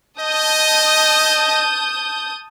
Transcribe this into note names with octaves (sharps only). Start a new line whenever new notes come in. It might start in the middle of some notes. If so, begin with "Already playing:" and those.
D#5 A5 D#6 G6